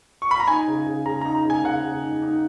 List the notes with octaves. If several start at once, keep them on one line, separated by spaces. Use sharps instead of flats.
C#6
B5
A#5
D#4 G#5
C#3
C#3
C#3 A#5
D#4 A#5
A#5
C#3 G#5
C#3 F#5
C#3
D#4
D#4